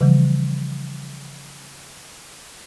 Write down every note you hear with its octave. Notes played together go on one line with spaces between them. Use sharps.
C#3 E3 F3 G3